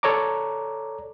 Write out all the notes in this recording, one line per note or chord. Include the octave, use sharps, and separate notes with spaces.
A4 C#5 D5 A#5 D6